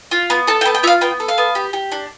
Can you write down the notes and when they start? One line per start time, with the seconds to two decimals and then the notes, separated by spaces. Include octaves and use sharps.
0.11 F4
0.30 B3
0.47 A4 A5
0.61 G5
0.66 B3
0.75 G5
0.83 F4 E5
0.87 F5
1.01 B3 G5
1.20 A4
1.28 F5
1.38 B3
1.55 G4
1.73 G4
1.92 D4